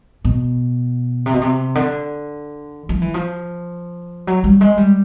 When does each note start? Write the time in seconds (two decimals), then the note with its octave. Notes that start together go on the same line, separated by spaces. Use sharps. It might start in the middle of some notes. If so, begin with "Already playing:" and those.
0.25 B2
1.26 C3
1.34 B2
1.42 C3
1.75 D3
2.89 F3
3.02 E3
3.14 F3
4.27 F#3
4.44 G3
4.61 G#3
4.77 G3